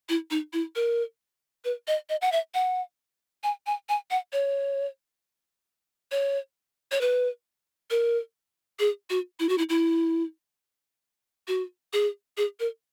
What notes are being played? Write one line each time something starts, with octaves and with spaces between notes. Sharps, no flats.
E4
D#4
E4
A#4
B4
D#5
D#5
F#5
E5
F#5
G#5
G#5
G#5
F#5
C#5
C#5
C#5
B4
A#4
G#4
F#4
E4
F#4
E4
E4
F#4
G#4
G#4
A#4